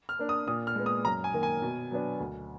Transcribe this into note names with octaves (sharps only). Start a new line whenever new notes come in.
F6
A#3 D4
D#6
A#2 D#6
F6
G#3 B3
D#6
F#2 A#5
G#5
D#3 A#3
G#5
B2
F#3 B3 D4
D2